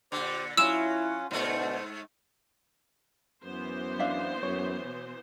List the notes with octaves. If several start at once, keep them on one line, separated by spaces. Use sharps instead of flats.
A#2 D3 G4 C5
F#3 C#4 E4 F4 E6 E7
D2 G#2 B2 A3 C5
F#2 E3 B3 C5
D4 E5 F5
F#2 C#5
B2